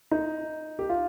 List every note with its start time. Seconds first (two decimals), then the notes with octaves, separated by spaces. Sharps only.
0.11 D#4
0.79 G4
0.89 F4